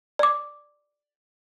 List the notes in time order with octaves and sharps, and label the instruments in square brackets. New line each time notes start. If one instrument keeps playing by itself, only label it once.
[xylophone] D5 D6